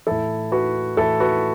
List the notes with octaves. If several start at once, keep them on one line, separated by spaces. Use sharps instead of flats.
A2 E3 E4 A4
F#4 B4
A2 E3 E4 A4
F#4 B4